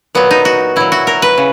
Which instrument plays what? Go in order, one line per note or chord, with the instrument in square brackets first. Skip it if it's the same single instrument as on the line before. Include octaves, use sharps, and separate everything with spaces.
[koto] A#2 F#3 B3
D#4
F#4
A#2 F#3 E4
F#4
A#4
B4
C#3